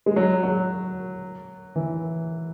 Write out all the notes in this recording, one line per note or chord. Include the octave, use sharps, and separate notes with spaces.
G#3
F#3
F#3
E3